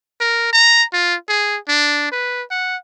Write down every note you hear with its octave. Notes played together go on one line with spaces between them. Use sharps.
A#4
A#5
F4
G#4
D4
B4
F#5